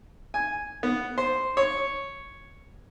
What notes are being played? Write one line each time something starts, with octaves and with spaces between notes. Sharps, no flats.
G#5
B3
C5
C#5